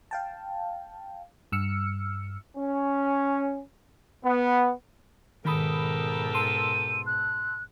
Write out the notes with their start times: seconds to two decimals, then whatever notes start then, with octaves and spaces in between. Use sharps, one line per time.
0.11 F5 G5 A5
1.52 G2 E6 F6 C#7
2.56 C#4
4.23 B3
5.45 G#2 B2 D#3 G4 A4 A#4 B5 D#6
6.34 A5 C6 E6 D#7
7.06 F#6